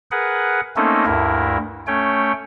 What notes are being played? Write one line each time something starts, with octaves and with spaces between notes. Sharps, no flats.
G#4 A#4 B4 F#5
A3 A#3 C4 C#4 D#4 A4
D2 G2 E4 A#4
A3 C#4 C#5 G5